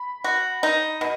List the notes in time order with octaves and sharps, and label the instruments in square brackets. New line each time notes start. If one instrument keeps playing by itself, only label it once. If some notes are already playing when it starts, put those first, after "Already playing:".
Already playing: [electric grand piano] B5
[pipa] F#4
D#4
B2